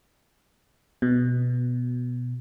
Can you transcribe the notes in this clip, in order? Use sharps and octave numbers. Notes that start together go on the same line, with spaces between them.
B2